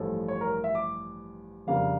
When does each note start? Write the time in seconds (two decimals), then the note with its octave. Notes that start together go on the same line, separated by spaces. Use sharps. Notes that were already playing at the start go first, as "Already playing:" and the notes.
Already playing: A1 G2 F3 A4
0.28 C#5
0.41 A#4
0.64 E5
0.75 D6
1.67 F2 C#3 G3 A#3 D4 F5